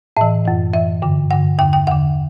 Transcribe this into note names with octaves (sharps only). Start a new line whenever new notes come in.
A2 E3 E5
F#2 E3
F#2 E3 E5
G2 D3
G2 D3 F#5
E2 D3 G5
G5
E2 D3 F#5